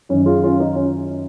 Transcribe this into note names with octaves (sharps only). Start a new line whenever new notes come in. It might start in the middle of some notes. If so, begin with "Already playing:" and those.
F#2 D#3 C#4
F4 G#4
C#4 F4
D#4
C#4